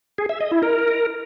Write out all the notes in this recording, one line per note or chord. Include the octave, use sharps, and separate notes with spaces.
G#4
E5
D#5
E4
A#4